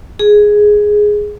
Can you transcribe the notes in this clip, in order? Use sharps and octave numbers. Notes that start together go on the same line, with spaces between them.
G#4